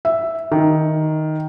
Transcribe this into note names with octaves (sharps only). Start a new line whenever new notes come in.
E5
D#3